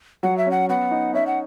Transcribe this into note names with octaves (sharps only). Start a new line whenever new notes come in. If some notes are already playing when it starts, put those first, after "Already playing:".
F#3 F#5
E5
C#4 F#5
B3 F#5
D#4
C#4 E5
F#5